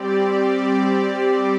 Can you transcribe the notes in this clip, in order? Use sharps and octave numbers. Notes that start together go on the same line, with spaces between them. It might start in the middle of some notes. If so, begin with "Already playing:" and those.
Already playing: G3 C4 G4 D5